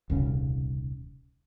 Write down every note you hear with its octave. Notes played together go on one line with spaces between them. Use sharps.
D#1 C2 C#3